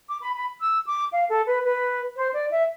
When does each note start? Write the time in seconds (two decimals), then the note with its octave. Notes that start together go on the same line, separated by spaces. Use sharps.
0.09 D6
0.22 B5
0.35 B5
0.60 E6
0.86 D6
1.12 F5
1.29 A4
1.46 B4
1.64 B4
2.16 C5
2.33 D5
2.51 E5